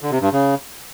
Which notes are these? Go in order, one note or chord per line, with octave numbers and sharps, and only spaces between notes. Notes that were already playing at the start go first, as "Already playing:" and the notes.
D3
C3
G2
C#3